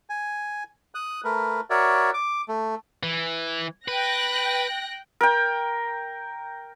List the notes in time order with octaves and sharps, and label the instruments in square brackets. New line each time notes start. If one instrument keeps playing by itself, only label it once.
[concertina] G#5
D#6 F#6
A3 A#4 B4
F#4 A#4 C#5 D5 E5
D6
A3
[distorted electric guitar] E3
[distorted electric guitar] B4 [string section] G5 F#6 A#6
[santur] A#4 G5